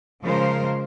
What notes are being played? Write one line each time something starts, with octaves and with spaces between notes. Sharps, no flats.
C#3 F3 G#3 A#4 C5